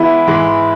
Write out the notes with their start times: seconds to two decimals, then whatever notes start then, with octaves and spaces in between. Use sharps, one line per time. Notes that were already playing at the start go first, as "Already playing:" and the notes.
Already playing: E3 G#3 B3 E4
0.27 G#2 E3 G#3